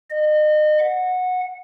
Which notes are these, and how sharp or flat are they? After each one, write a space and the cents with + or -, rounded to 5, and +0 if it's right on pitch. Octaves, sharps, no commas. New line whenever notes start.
D#5 -35
F#5 -15